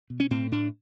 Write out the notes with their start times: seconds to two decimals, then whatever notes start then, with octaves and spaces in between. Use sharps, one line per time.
0.10 B2
0.20 C#4
0.31 A2 C4
0.52 A2 D4